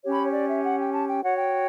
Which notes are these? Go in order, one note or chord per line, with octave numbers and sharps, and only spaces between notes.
C#4 G4 C#5
B5
C#5
D5
E5
F#5
G5
A5
G5
F#4 C#5 F#5
G5